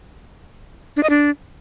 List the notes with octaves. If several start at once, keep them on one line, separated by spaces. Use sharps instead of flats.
D4
D#5
D4